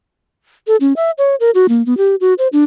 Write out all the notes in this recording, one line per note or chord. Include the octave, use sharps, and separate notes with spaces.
A4
C#4
E5
C#5
A#4
F#4
A#3
B3
G4
F#4
C5
D4